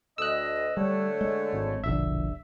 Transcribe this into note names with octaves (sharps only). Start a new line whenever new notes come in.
D2 D#5 E6 F#6
D3 G3 A3 C#5
G#3
G#1
E1 A#1 D3 E5